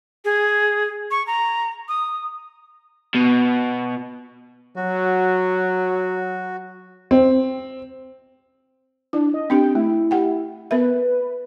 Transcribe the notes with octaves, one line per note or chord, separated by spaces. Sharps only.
G#4
C#6
A#5
D#6
B2
F#3 F#4
C4
D4 E4
D#5
C4 D4 G4 G5
A3 E4
G4 F#5 G5
B3 A#4 B4 E5